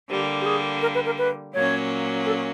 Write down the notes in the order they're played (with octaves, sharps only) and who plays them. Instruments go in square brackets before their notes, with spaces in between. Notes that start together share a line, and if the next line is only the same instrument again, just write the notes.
[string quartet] D3 G3 A#3 [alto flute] G4
[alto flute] G4
G#4
A#4
B4
A#4
B4
[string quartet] A#2 F#3 A#3 C#4 [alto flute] C#5
[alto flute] A4